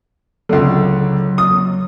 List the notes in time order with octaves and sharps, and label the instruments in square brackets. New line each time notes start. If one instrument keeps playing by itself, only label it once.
[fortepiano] C#2 D3 [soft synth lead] F#3
[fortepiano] D#6